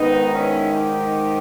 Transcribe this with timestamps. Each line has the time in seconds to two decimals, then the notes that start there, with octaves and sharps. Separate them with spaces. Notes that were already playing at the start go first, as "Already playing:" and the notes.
Already playing: G#2 D#3 B3 D#4
0.31 C#4 E4
0.72 D#4 G4